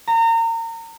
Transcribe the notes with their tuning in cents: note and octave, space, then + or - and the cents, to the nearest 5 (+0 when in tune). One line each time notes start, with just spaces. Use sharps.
A#5 -30